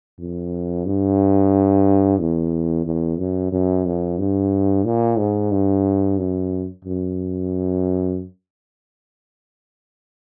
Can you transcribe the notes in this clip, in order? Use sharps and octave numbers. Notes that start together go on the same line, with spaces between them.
F2
G2
E2
E2
F#2
F#2
F2
G2
A#2
G#2
G2
F#2
F#2